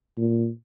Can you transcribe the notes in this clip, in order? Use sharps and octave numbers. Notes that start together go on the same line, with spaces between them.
A#2